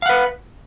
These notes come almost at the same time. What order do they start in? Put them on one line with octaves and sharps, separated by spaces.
F5 F#5 B4